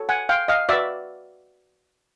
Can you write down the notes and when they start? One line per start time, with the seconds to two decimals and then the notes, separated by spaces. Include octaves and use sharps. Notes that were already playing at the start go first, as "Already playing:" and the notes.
Already playing: F#4 A4 C#5
0.09 F#5 G#5
0.29 F5 G5
0.48 D#5 F5
0.69 F#4 B4 D5 E5